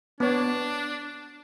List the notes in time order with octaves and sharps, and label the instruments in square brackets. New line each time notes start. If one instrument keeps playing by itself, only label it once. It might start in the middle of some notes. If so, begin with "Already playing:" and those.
[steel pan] B3 C#5 [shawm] D4